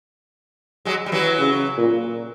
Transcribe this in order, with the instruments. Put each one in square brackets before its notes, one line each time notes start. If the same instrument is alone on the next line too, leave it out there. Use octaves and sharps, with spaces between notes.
[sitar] F#3 G#3
G3
E3 F#3
[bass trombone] C#3
A#2